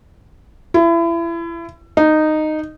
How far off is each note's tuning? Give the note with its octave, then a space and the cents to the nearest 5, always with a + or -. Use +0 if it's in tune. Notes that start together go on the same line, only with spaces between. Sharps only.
E4 +30
D#4 -10